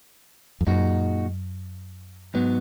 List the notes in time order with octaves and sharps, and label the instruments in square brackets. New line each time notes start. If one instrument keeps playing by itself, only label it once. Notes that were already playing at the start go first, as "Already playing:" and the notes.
[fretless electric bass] F2
[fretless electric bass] F#2 [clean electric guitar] A#2 G#3 D#4 F#4
[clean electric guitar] G#2 F#3 B3